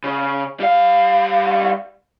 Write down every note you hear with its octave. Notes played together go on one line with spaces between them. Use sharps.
C#3
G3 F5